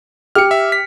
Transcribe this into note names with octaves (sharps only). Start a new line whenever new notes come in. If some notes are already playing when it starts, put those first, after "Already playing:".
G4 F6 C#7
E5
B6